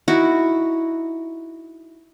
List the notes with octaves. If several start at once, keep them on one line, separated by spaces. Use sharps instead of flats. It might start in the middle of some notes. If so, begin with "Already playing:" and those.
D#4 E4 F#4